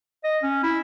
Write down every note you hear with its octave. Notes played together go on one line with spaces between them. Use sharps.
D#5
C#4
E4